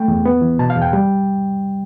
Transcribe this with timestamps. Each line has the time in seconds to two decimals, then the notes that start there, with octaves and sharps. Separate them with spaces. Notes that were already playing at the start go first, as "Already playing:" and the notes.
Already playing: A3 G5
0.08 E2
0.25 B3
0.41 E3
0.59 B2 A5
0.70 F5
0.76 E2
0.82 G5
0.93 G3